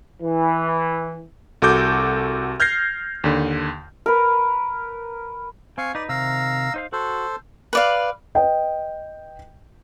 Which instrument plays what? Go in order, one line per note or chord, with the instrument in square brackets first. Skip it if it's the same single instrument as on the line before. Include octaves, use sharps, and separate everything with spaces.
[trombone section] E3
[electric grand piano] C2 F#4 A4 D6 G6
F6 G6 G#6 A#6 C7
D#2 D3
[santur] A#4 B4
[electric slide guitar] C4 [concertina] F5 G#5 C#6
[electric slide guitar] D#4 B4 [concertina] D5
[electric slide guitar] C3 D#3 [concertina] F5 A#5 E6
[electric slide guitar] D#4 C5 F5
[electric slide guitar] F#4 [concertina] A4 C5
[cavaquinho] B4 D5 F5
[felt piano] B4 D#5 G5